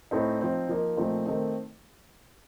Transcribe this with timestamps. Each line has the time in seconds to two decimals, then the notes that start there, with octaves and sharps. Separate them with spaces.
0.11 A2 A3 C4 D#4
0.40 F3 C4 D#4
0.69 F3 A#3 D#4
0.97 A#2 F3 A3 C4 D#4
1.26 D#3 A3 C4 D#4